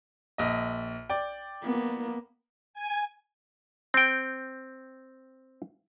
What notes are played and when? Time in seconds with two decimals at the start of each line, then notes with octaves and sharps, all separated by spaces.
0.38 A#1 D#5
1.10 D5 G5
1.64 A#3 B3
2.74 G#5
3.94 C4 G5